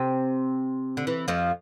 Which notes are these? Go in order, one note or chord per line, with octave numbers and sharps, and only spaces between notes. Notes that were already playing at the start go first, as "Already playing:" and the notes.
Already playing: C3 C4
D3
E3
F2 F3